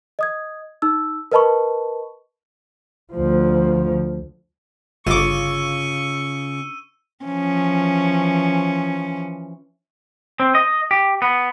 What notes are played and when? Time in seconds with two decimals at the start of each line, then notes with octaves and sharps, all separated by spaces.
0.19 D#5 D#6 G#6
0.82 D#4 E6
1.32 A#4 B4 D#5 A5 B5 C#6
3.13 D2 F3
5.07 G1 C#3 F4 C#6 D6 E6 D#7
7.25 E3 F3 C#4
10.40 C4
10.55 D#5
10.91 G4
11.22 B3